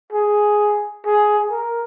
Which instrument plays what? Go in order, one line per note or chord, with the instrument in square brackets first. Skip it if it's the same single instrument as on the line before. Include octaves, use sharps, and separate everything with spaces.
[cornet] G#4
G#4
A#4